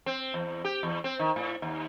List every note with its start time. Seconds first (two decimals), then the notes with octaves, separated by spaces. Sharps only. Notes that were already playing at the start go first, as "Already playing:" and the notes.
0.06 C4
0.34 E2
0.64 G4
0.83 E2
1.04 C4
1.19 D#3
1.36 A2
1.62 D#2